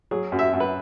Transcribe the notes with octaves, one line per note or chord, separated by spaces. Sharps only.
F#3 G#4
F#2
E5
F#2
B4